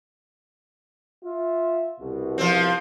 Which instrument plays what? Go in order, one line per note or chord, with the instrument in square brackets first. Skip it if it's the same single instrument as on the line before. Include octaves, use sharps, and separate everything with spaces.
[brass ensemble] F4 E5
C2 B2
[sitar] F3 C4